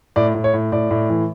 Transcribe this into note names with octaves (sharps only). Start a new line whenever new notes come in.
A2 D5
A2
C#5
A2
A2 D5
A2
E3